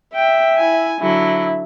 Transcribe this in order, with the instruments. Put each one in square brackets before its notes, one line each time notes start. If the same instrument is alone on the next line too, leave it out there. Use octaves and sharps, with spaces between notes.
[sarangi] E5 [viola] G5
[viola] E4 G#5
[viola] D3 F#3 [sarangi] E4